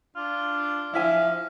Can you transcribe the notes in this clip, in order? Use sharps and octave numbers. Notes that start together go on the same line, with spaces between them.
D4 F4
F3 E4 E5 F5 G#5